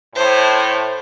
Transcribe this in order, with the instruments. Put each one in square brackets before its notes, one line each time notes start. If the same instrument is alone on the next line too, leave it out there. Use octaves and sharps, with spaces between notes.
[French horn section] A2 [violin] C5 C#5